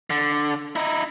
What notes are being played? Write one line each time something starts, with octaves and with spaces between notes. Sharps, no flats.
D3
D#4 E4